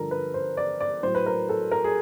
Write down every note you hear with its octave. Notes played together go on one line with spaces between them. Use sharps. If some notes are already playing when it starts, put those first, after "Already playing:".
Already playing: G2 D3 F3 A4 A#4
B4
C5
D5
D5
A2 F#3 C5
B4
A#4
A4
A#4
G#4